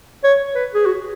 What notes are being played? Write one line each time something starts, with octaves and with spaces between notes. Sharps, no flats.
C#5
B4
G#4
F#4